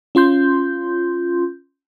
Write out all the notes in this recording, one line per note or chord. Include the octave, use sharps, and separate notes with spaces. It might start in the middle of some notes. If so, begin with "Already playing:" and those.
C#4 F4 C6 G6